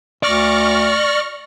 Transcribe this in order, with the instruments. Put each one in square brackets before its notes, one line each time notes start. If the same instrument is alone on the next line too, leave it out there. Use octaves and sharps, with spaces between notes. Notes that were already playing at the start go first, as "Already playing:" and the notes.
[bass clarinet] D2 [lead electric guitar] D5 [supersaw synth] C#6 F6 A#6